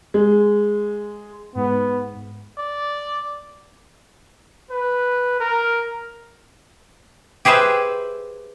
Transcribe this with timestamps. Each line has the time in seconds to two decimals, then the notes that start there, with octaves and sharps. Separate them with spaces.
0.14 G#3
1.55 G#2 B3
2.58 D5
4.71 B4
5.40 A#4
7.45 G4 G#4 B4 C5 E5